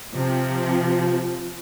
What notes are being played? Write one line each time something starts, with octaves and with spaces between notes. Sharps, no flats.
C3 F3